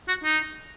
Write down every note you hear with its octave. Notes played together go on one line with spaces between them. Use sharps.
F#4
D#4